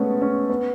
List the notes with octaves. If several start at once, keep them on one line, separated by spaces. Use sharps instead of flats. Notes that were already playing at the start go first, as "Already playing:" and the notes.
Already playing: G#3 A3 B3 C#4
C#4
B3